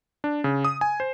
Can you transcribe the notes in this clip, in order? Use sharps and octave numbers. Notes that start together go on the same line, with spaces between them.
D4
C#3
D#6
G#5
C5